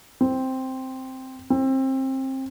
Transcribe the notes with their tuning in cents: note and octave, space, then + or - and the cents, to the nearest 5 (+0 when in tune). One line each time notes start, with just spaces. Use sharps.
C4 +0
C4 +25